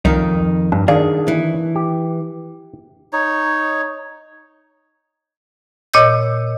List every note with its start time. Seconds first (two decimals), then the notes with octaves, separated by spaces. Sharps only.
0.05 C2 F2 D#3 D#4
0.72 G2 D4
0.88 D#3 D4 G#4 D5 F5 A5
1.28 E3
1.75 G4
3.13 D#4 C#5
5.94 A#2 C#5 D#5 E6 G6